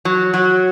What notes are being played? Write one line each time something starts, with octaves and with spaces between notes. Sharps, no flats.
F#3
F#3